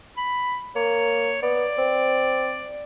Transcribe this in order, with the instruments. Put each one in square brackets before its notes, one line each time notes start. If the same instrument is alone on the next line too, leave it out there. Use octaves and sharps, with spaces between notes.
[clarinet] B5
[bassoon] A#3 [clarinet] C#5
[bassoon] B3 [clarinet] D5
[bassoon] C4